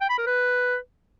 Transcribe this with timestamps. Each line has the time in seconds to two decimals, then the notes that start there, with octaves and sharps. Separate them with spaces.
0.01 G5
0.10 B5
0.18 A#4
0.26 B4